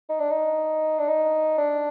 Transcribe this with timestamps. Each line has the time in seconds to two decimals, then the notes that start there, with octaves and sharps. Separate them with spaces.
0.09 D#4
0.20 D4
0.30 D#4
0.99 D4
1.08 D#4
1.58 D4